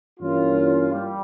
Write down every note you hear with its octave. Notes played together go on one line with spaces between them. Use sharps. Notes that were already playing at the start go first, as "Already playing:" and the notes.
G2 E3 A#3 C#4 F4
G3